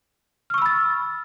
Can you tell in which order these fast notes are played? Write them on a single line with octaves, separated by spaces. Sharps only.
F6 C#6 E6 B5 A6